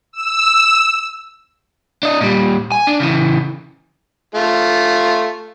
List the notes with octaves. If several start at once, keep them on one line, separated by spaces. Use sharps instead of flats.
E6
D4 D#5
A#2 G3
G#5
D4
C#3 E3
A3 F4